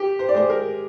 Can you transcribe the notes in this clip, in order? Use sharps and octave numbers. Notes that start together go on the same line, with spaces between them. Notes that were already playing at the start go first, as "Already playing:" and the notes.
Already playing: G4
C5
D5
G#3 C5
A#4